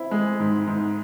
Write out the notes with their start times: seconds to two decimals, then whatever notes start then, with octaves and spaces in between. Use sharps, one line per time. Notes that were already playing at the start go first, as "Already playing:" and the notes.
Already playing: C4 E4
0.11 G#3
0.40 G#2
0.67 G#2